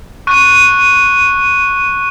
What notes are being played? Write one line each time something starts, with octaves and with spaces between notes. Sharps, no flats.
C#6 F#6 D#7